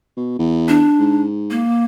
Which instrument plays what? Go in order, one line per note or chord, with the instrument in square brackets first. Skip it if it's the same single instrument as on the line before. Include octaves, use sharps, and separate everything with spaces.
[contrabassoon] B2
E2
[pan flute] D4
[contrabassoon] G#2
[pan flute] A#3